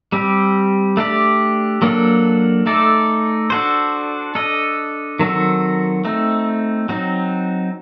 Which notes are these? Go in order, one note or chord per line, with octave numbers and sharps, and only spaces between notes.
G3 C4 G4
A3 D4 G4 D5
F#3 A#3 D4 A4
A3 D#4 A4 D5
D4 F#4 A4 C5
D4 A4 D#5
D#3 F#3 C4 F#4 A4
A3 C4 D#4
F#3 C4 D#4